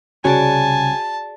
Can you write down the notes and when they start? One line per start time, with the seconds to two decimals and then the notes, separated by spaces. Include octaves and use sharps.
0.25 C2 C#3 F#4 G#4 D5 G#5 A5